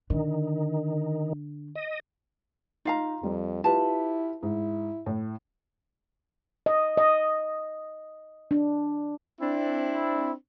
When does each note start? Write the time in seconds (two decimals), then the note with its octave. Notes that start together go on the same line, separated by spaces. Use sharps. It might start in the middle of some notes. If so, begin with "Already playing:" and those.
0.10 D3 D#3
1.75 D#5
2.85 D#4 F4 F5 A#5
3.23 F2 G3
3.64 E4 F4 G4 B4 A5
4.43 G#2 E4
5.06 A2
6.66 D#5
6.97 D#5
8.51 D4
9.41 C4 D4 E4